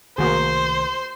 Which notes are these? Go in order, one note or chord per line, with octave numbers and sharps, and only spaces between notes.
C2 D#3 A3 A#3 F#4 G#4 C5